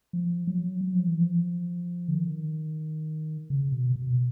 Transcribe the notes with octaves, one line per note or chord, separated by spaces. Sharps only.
F3
F#3
F#3
F3
E3
F3
D3
D#3
C#3
B2
B2